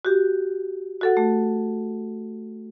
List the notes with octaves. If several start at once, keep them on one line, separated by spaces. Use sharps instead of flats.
F#4 G4
F#4 A4 F#5
A3